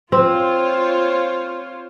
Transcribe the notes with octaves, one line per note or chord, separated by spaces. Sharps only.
C4 F4 C5 C#5